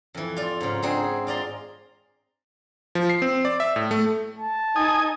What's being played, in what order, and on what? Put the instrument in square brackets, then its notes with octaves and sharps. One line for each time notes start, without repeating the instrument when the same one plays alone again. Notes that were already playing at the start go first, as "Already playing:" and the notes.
[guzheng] F2 E3
F4 D5
G#2 C#3
C4 D4 D#4 G#4 F#5
F4 D5 A#5 C6
[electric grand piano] F3
C7
C4
D5
E5
A2
A3
[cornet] A5
[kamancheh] D#4 [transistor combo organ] G#5 D#6